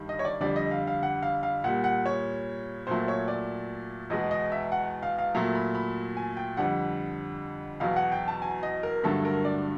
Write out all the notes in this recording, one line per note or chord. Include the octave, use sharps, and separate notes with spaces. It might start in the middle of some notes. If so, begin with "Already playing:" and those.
Already playing: G2 D#3 G3
D#5
C#5
D5
F2 D3 G3 D5
D#5
F5
F5
F#5
F5
F5
A#2 G3 F#5
F#5
C#5
A#2 F#3 A3 C5
C#5
D5
E2 B2 G#3 D#5
D#5
E5
F#5
F5
F5
A#2 F#3 A3 A#5
B5
B5
G#5
G5
F2 D3 G3 F#5
E2 B2 F#3 F5
F#5
G5
A5
G#5
D#5
A#4
G2 D3 F#3 A3 A4
A#4
D5